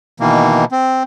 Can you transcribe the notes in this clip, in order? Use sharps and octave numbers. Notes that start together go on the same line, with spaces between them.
B2 D#3 E3 A#3
C4